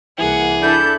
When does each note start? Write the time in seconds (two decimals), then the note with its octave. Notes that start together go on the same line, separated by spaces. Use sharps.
0.19 C2 E3 A#3 G#4 F#5
0.63 D4 E4 A4 G6